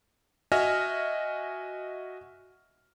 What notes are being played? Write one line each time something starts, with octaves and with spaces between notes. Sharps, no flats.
F#4 D#5 E5 G#5 F6